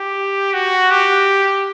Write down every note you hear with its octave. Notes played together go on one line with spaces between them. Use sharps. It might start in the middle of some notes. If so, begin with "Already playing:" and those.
Already playing: G4
F#4
G4